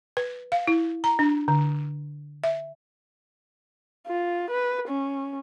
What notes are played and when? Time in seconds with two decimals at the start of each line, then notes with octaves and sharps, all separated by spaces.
0.17 B4
0.52 F5
0.67 E4
1.04 A#5
1.19 D4
1.48 D3
2.44 E5
4.07 F4
4.51 B4
4.88 C#4